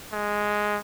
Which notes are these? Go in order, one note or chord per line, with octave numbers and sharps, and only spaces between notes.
G#3